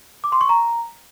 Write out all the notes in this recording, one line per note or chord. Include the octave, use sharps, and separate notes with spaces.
D6
C6
C#6
A#5